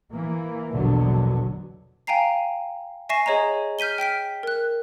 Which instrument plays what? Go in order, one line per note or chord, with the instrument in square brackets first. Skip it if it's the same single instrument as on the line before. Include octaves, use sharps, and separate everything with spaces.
[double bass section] E3 A#3
A#1 E2 B2 D3 F#3
[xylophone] F5 G5 G#5 A#5 C7
E5 G#5 C#6 A#6 C7 E7
G#4 C#5 D#5 G#5 A#5
F6 G6 B6 D#7 G7
G5 F6 B6 D7
A#4 F#6